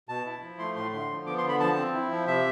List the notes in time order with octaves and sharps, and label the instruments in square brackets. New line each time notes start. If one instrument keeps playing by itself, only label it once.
[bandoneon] B2 A5
E4
F3
A3 C6
A2 C6
D3 C6
F3
B3 D6
C6
D3
B5
F3 A5
C4
E4
F3
C3 E5